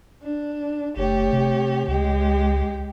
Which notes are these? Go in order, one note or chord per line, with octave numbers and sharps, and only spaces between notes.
D4
F#1 A3 G4 C#5
C3
C#2 G#3 G4